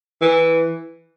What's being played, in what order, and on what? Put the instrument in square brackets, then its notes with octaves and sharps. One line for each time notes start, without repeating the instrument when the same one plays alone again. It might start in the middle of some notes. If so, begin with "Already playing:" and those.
[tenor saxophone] E3